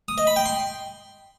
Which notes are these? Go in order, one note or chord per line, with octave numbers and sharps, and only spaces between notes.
D#6
D#5
B5
G5
C6